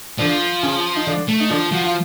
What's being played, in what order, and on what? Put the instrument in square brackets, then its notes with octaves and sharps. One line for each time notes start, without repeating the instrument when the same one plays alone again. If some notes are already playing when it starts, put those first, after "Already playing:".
[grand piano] D3 D4 [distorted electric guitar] F3
[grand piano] C#3 C#4
D#4
D3 D4
[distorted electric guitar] A3
[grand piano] D#4
[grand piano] D3 D4 [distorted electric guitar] F3
[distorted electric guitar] F3 [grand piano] F#4
[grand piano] F4